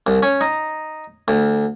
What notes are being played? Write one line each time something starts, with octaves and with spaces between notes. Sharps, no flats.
C2
C#4
D#4
D2